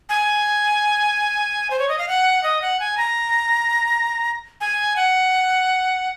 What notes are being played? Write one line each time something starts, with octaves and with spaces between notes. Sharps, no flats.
G#5
C5
C#5
D#5
F5
F#5
D#5
F#5
G#5
A#5
G#5
F#5